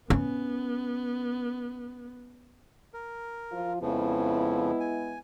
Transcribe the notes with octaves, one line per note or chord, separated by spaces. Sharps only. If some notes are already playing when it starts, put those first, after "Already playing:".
B3 C#4
A#4
F3 F4
F2 C#3 F3 G#3 B3 E4
G#5